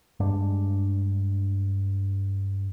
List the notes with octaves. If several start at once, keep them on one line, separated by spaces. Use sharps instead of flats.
G2 G#3 D4